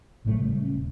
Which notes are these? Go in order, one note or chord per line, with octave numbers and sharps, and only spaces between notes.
G#1 A2 F#3 A3
C#3 G3 A3
C#4
D#1